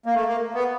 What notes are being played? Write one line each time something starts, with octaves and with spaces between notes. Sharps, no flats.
A#3
A3
A#3
B3